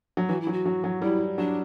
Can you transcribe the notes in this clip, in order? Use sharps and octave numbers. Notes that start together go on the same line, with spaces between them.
F#3
E3 F#4
E4
F#3
F#4
F#3
F#3
G3 E4
F#3 D4